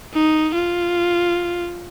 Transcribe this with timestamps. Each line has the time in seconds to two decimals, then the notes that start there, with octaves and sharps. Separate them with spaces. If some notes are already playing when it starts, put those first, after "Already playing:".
0.13 D#4
0.55 F4